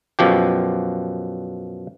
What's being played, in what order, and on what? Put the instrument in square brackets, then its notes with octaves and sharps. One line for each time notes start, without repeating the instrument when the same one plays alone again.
[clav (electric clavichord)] F#2 B2 F3 G4